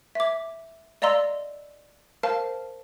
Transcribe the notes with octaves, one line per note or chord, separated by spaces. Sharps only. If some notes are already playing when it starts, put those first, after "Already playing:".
E5 D6
D5 D#5 F5 A#5 C6 E6
A#4 C5 F5 A5